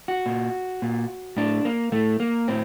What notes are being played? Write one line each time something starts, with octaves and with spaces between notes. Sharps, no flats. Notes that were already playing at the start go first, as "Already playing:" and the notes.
F#4
A#2
A#2
A2 D4
A#3
A2 A3
A#3
A2 C4